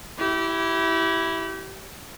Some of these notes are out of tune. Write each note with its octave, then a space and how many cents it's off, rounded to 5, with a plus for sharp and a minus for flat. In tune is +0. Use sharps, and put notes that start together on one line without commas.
E4 +0 G4 -30